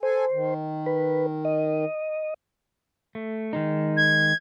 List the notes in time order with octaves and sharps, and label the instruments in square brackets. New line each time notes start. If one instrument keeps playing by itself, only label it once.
[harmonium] A4 G#5 [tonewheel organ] C5
[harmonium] D#3
[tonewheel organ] B4
D#5
[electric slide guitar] A3
D#3 G#3 D#4
[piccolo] G#6